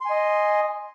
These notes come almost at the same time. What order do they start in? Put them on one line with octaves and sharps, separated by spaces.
C6 G#5 D#5